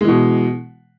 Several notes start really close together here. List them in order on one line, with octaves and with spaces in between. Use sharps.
G#3 E3 B2